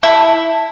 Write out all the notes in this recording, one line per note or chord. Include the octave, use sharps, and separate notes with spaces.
E4 A5